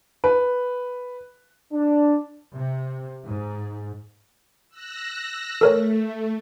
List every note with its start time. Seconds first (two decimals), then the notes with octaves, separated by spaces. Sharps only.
0.24 B4
1.72 D4
2.54 C3
3.25 G#2
4.69 E6 F#6 A#6
5.61 A3 A4 A#4 C#5